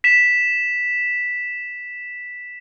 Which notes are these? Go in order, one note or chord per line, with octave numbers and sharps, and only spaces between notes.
B6 E7